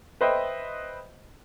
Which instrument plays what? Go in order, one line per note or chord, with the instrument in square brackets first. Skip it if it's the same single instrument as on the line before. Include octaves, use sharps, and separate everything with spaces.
[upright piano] B4 C5 D#5 E5 G5